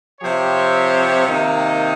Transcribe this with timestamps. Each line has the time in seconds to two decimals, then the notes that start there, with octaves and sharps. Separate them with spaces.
0.21 C3 F3 C4 G4 C#5
1.27 C3 D#3 A#3 D#4